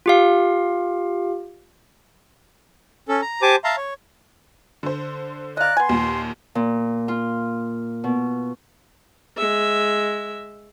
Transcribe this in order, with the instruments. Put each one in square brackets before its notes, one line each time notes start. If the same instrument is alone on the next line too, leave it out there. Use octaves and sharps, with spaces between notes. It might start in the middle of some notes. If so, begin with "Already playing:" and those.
[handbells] F4 G4 F5
[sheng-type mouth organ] C#4 A4
A#5
G4 C5 G#5 A5 D6
E5 F5 A5 A#5 C6
C#5
[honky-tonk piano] D3 C5
[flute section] D5 A#5 F#6 [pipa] D#5 F5
[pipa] B3 G#5 [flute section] C6
[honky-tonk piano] D#2 A#2
[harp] A#2
F4
B2
[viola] G#3 E5